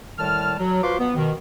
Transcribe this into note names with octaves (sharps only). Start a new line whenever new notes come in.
A2 D#3 G3 A5 F6
F#3
F4 F#4 B4 C5 C6 D6
B3
B2 D#3